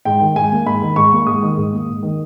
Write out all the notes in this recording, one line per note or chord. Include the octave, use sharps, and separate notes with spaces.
G#2 G5
D#3
G#2 G#5
A#3
G#2 B5
D#3
G#2 C#6
A#3
G#2 D#6
D#3
G#2
A#3
G#2
D#3